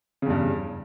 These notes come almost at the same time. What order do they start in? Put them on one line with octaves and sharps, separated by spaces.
C#3 E2 G2